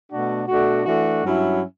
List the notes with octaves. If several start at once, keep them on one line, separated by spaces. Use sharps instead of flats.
B2 A3 D4 F#4
B2 A3 D4 F#4
E3 A3 D4 F#4
G2 F#3 C#4 E4